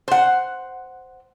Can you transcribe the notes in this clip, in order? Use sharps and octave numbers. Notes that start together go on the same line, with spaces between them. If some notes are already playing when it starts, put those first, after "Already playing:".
C5 F#5